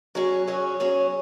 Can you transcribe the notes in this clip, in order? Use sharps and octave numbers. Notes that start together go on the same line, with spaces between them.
F#3 C#4 G#4 C#5
F#3 C#4 G#4 C#5
F#3 C#4 G#4 C#5